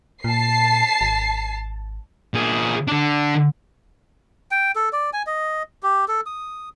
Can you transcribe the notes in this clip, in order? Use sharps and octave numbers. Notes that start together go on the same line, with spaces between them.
A#2 A5 C7
G#1
A#2 G#4
D3 D4
G5
A4
D5
G#5
D#5
G4
A4
D#6